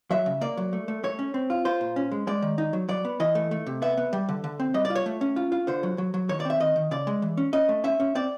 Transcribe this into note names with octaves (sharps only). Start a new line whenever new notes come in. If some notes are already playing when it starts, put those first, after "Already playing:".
F#3 E5
C#3
A#3 D5
F#3
A3
A3
A3 C#5
C#4
C4
F4
F4 C5
A#2
C#4
G#3
G#3 D5
D#3
D#4
F#3
F#3 D5
B3
E3 D#5
A3
A3
C3
B3 E5
B3
G3
D3
D3
C4
G3 D#5
D5
F4
C#5
A3
C#4
F4
F4
D3 C5
F#3
F#3
F#3
D#3 C#5
D5
C4 E5
D#3 D#5
D#3
C#3 D5
G#3
E3
C#4
C#4 D#5
A3
C#4 E5
C#4
C4 D5